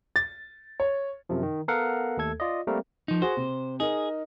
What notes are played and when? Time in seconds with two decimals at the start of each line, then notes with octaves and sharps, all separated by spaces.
0.16 A6
0.80 C#5
1.29 F#2 C3 F3
1.43 D#3
1.68 B3 A4 A#4 F5 F#5
2.17 D#2 A3 A4 G#6
2.40 F4 D5 D#5
2.67 G3 A3 A#3 C4 A#4
3.08 F3 D#4
3.22 F#4 G#4 C5
3.37 C3
3.80 D#4 G#4 A#4